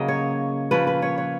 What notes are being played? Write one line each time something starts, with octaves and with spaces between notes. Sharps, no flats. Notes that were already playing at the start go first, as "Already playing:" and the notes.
Already playing: C#3 F#3 A#3 D#5
C#5
F3 A#3 C#4 B4
B4
C#5
C#5